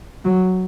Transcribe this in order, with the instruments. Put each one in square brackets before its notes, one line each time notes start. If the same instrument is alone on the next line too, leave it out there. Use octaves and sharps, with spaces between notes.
[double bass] F#3